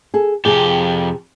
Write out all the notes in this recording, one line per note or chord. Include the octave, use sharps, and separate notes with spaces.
G#4 A4
F2 C3 G4 G#4 G5